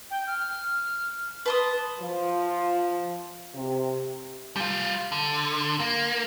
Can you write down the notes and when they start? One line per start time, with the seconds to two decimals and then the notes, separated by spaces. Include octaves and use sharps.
0.11 G5
0.27 F6
1.46 B4 A5 C6 D#6
2.00 F3
3.55 C3
4.56 G3 F4
5.12 D3
5.80 A#3